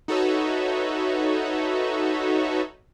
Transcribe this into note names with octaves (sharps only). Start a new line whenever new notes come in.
D#4 F#4 A4 B4 C#5 E5